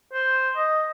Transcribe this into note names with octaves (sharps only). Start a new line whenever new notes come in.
C5
D#5